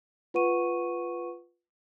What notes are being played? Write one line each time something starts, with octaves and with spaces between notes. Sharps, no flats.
F4 B4 F#5 C#6 D#7